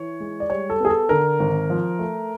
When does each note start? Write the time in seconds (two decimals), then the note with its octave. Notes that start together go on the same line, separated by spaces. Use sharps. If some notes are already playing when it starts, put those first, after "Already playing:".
Already playing: E3 C#5
0.20 G#3
0.40 D5
0.50 G3 C#5
0.70 A4
0.80 B3 G#4
0.90 A4
1.09 D3 A#4
1.40 G#1
1.70 F3
1.99 A3